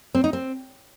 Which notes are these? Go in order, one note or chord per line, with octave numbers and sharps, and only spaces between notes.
C4
D#4
C4